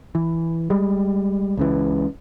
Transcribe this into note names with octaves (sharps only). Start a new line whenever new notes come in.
E3
G3 G#3
C#2 C#3 E3